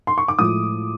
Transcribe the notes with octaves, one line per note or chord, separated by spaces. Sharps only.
C6
C#6
D6
A2 F3 G#3 D#6